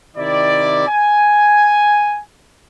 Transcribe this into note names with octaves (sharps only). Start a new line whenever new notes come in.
C3 D#3 E4 D5
G#5